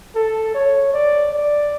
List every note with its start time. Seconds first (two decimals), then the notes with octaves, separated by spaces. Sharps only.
0.15 A4
0.55 C#5
0.94 D5
1.33 D5